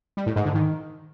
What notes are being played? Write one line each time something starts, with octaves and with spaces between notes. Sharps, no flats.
G3
A2
G#2
D3
D#3